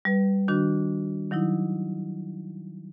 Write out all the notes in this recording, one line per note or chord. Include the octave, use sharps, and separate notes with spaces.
G3 B4
D#3 D4 F#4
D#3 F#3 D#4 E4